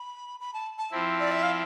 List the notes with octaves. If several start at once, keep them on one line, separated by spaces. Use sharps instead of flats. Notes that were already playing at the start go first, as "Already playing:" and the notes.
Already playing: B5
B5
A5
A5
F3 C4 E4
D5
E5
F5